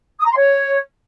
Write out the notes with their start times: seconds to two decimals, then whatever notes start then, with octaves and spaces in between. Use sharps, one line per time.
0.19 D#6
0.25 A#5
0.30 C6
0.36 C#5